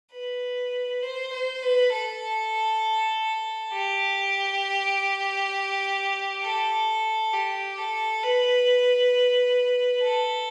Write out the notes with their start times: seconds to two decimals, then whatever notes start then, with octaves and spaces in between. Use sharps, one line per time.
0.12 B4
1.02 C5
1.33 C5
1.63 B4
1.92 A4
3.73 G4
6.43 A4
7.33 G4
7.78 A4
8.23 B4
10.03 A4